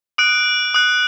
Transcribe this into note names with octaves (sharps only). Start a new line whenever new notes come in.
D#6 F#6 D7
D#6 F#6